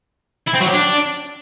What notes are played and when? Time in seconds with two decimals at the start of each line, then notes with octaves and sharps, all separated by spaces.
0.47 E4
0.53 C4
0.60 F#3
0.66 G4
0.73 D4